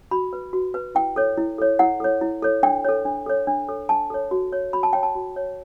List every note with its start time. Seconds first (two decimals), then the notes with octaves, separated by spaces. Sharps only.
0.11 F#4 B5
0.33 B4
0.53 F#4
0.74 B4
0.95 E4 G5
1.16 A4 C#5
1.37 E4
1.58 A4 C#5
1.79 E4 F#5
2.00 A4 C#5
2.21 E4
2.43 A4 C#5
2.63 D4 G5
2.85 A4 C#5
3.05 D4
3.26 A4 C#5
3.47 D4
3.69 A4 C#5
3.89 D4 A5
4.10 A4 C#5
4.31 F#4
4.53 C#5
4.73 F#4 B5
4.83 A5
4.93 C#5 G5
5.03 A5
5.15 F#4
5.36 C#5